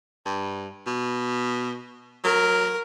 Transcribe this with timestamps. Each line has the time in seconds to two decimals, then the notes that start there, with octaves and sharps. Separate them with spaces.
0.26 G2
0.87 B2
2.25 F#3 A#4